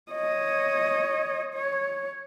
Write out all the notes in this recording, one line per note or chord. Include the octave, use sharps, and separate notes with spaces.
C#5 D#5
C#5